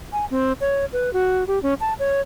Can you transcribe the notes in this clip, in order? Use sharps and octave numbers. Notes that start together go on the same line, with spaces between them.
G#5
C4
C#5
B4
F#4
G4
C#4
A5
C#5